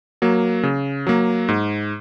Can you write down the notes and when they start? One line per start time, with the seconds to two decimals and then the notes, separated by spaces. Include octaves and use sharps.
0.22 F#3 A#3
0.63 C#3
1.07 F#3 A#3
1.48 G#2